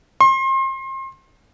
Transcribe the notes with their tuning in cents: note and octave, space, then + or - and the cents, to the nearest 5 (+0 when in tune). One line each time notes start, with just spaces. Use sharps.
C6 +35